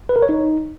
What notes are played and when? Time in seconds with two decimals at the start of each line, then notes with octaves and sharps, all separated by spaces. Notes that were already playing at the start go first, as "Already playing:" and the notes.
0.09 B4
0.16 A#4
0.22 C#5
0.29 D#4